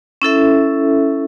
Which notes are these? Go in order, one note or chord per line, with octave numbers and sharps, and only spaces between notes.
C#4 E4 A4 E5